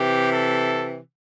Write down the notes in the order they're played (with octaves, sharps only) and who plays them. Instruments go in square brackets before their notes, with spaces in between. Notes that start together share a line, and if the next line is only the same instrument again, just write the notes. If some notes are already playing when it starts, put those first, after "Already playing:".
Already playing: [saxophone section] C3 E3 [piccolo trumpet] G4
[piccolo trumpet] A4